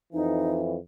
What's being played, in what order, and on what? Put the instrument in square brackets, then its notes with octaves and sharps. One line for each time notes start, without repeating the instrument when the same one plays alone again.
[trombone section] F2 E3 [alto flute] D#4